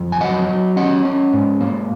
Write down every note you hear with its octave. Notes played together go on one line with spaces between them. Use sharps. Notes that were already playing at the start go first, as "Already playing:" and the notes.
Already playing: F2
G#5
F#3 D#5 F#5
F#3
C#4 D#5 F#5
C#4
G#2
A#3